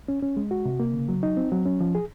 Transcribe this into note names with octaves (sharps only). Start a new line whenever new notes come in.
C#4
C#4
G#3
F#4
C3
A#3
C#3
F#3
D#4
C4
F#3
C#4
F3
G#4